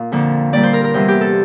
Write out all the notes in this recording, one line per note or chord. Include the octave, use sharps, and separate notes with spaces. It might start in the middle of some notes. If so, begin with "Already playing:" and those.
Already playing: A#2
F2 D3 F3 A#3
A#2 G3 A#3 D5
C5
A#4
A#4
E2 C3 E3 G3 C5
G4
A4